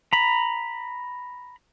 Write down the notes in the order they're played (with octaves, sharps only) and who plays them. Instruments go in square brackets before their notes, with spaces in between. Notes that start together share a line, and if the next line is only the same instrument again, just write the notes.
[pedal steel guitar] A#5 B5